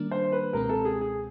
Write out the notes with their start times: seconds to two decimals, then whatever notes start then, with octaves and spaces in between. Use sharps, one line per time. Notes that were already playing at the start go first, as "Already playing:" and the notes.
Already playing: D#3 G3 A#3 D4
0.11 C5
0.32 B4
0.53 C#2 B2 G#3 C4 A#4
0.69 A4
0.85 G#4
1.01 G#4